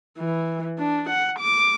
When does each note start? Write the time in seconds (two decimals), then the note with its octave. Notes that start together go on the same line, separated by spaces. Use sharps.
0.18 E3
0.79 D4
1.09 F#5
1.39 D6